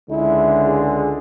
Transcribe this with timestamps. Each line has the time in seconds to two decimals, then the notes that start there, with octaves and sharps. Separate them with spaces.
0.10 C#2 D3 G#3 E4
0.65 G#4